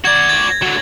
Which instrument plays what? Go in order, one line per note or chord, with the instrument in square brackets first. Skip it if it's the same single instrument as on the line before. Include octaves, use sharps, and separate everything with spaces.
[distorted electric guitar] F#4 D5 [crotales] G#6
[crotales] A6
[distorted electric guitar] D3 F#3